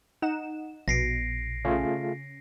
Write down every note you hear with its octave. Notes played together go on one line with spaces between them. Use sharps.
D#4 F#5 E7
A#1 B2 A#6 C7 D7
C#3 A3 C#4 F4 G#4